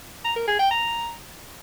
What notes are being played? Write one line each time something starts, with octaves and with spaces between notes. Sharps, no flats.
A#5
A#4
G#4
G5
A#5